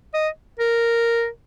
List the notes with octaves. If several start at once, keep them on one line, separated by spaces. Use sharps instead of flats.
D#5
A#4